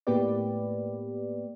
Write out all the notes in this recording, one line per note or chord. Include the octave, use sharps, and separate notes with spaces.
A2 A#3 B3 G4 B4 D5